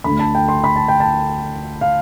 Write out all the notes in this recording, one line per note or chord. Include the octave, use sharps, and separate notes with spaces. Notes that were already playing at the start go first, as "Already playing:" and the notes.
D2 D3 A3 B5
A5
G5
C6
B5
A5
G5
A5
F5